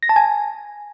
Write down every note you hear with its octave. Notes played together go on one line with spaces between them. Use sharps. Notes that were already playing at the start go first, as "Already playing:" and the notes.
A#6
A5
G#5